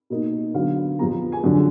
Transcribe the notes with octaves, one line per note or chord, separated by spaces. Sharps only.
B2 A#3 D#4
D3 F#3 B3 F5
F2 F3 B3 A#5
G#5
F#2 D3 F3